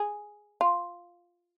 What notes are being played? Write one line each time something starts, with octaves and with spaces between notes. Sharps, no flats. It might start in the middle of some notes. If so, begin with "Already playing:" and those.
Already playing: G#4
F4